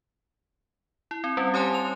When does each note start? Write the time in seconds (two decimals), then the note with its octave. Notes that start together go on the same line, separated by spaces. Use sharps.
1.11 E4
1.24 C4
1.37 G3 C#4
1.54 G4 C#5 G#5 A5 C6
1.74 F7